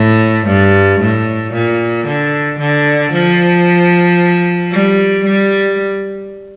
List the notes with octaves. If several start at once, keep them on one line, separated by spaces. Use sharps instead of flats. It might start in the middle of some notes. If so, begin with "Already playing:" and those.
Already playing: A2
G2
A2
A#2
D3
D3
F3
G3
G3